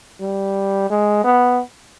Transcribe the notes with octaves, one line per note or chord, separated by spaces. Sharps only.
G3
G#3
B3